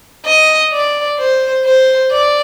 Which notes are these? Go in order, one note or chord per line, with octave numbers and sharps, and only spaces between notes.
D#5
D5
C5
C5
D5